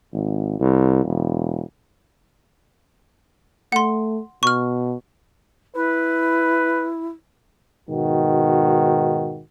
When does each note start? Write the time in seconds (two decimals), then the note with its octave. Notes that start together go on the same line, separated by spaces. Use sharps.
0.13 G#1
0.59 C2
1.04 E1
3.72 A3 F#5 C6
4.43 B2 C#6 F6
5.76 E4 B4
7.90 G#2 B2 D#3 F#4